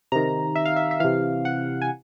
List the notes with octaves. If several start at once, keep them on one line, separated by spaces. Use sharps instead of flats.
C3 D#3 A#5
E5
F5
E5
E5
C3 E3 F5
F#5
G#5